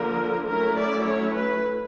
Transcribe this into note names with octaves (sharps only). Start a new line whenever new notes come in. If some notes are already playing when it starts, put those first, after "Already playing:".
Already playing: D3 F3 A#3 A#4
F#3 A3 C#4 E4 A#4
D5
C#5
B4